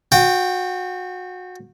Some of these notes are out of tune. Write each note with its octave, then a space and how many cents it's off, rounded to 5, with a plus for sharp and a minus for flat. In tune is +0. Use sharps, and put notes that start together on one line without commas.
F#4 -25 G5 +0